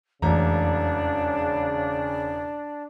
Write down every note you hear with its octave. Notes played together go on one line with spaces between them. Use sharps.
E1 F2 C#3 E3 A3 D4 A#5